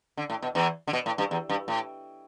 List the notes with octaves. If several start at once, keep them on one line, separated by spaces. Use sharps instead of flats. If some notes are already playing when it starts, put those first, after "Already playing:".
D3
A2
B2
E2 E3
D3
B2
A2
G2
E2
G2
A2